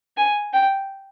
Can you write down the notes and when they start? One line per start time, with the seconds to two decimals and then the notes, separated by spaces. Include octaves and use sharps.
0.17 G#5
0.53 G5